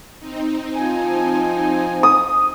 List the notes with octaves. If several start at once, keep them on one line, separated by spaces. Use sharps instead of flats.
C4 D#4
F3 G#5
D#6